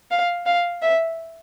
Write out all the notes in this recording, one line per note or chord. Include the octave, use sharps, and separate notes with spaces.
F5
F5
E5